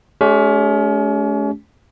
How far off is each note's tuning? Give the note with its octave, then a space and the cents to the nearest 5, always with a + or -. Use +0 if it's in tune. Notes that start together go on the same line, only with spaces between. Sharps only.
A3 -40 C#4 +35 G4 +0